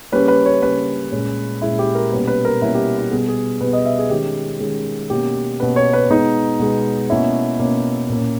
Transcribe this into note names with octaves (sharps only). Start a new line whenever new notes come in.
C#3 G3 A#3 C#4 B4
B4
C#5
C#3 G3 A#3 C#4 B4
A#2 G#3 C#4
A#2 G#3 C#4 E4
G4
A#4
B2 G3 A#3 C#4 B4
B4
A#4
B2 G3 A#3 C#4 E4
G4
E4
B2 G3 B3 G#4
G#4
B2 G3 B3 B4
D#5
E5
G#4
D#3 G#3 C#4 G4
D#3 G#3 C#4
B2 A#3 C#4 G4
B2 A#3 C#4 B4
C#5
B4
B2 G#3 B3 D#4
B2 G#3 B3
B2 A#3 C#4 E4
B2 A#3 C#4
A#2 A#3 C#4